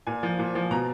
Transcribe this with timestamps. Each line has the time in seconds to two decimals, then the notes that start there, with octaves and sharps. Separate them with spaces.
0.07 A#2 G#5
0.23 F3
0.39 A#2
0.55 F3
0.71 B2 A#5